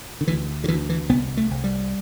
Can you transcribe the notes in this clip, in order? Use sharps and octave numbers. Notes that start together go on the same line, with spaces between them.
D3
D2 E3
D3
D2 E3
E3
C2 B3
A3
C2
G3